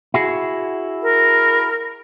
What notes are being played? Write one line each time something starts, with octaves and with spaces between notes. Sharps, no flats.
E4 F#4 G#4
A#4